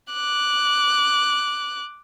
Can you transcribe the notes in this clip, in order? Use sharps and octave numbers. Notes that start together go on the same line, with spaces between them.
D6 F#6